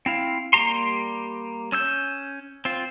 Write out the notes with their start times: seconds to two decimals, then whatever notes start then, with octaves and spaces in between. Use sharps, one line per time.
0.06 C4 E4 F5
0.53 G3 A#3 G4 A#5 C6
1.72 C#4 E6 G6
2.65 C4 F4